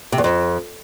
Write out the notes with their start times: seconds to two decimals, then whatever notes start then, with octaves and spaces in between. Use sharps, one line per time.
0.12 C3
0.18 E2
0.24 F2